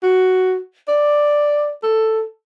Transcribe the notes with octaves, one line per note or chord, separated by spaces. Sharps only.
F#4
D5
A4